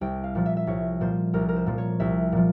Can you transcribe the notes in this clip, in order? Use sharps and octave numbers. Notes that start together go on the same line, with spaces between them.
C2 G5
F5
A#2 F3
E5
E5
C2 C#5
A#2 F3 C5
C2 A#4
A#4
C5
A#2 F3
C#5
C2 E5
A#2 F3